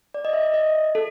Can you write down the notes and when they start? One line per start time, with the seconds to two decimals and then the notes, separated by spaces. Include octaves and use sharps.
0.14 D5
0.25 D#5
0.33 E5
0.54 D#5
0.95 A4